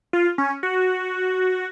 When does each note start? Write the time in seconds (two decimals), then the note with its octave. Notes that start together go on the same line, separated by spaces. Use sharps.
0.13 F4
0.38 C#4
0.63 F#4